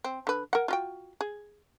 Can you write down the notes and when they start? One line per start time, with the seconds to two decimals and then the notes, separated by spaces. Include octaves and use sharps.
0.04 C4
0.27 D3 B4
0.53 A#4 F#5
0.68 F4 F#4 G5
1.21 G#4